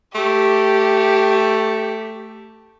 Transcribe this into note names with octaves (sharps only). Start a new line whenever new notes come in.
A3 G4